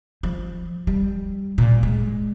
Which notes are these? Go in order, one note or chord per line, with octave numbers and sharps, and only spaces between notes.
F3
G3
A#2
G#3